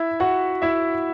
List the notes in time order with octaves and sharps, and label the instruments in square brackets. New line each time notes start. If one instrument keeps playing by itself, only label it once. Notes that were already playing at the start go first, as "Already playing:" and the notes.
Already playing: [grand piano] E4 E5
F#4 F#5
E4 E5